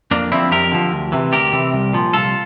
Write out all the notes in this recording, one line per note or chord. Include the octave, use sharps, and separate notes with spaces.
F2 A#3 D4
D3 F3 C4 E4
F2 G4 A#4
D3 F3
D2
C3 E3
D2 G4 A#4
C3 E3
C2
A#2 F3
C2 F4 A4